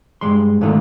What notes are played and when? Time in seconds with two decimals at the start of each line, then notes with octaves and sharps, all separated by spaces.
0.21 G2 G#3 C6
0.61 G#2 D3 D#3 A3 F4